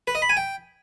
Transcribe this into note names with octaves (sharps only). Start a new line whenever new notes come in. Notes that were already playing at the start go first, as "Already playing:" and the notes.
B4
D#5
B5
G#5
G5